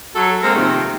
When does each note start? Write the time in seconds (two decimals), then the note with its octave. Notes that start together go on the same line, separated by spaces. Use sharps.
0.15 F#3 A4
0.43 G#3 A#3 C4 A#4 C5 F5
0.55 C3 D#3 F3 A3 A#3 C4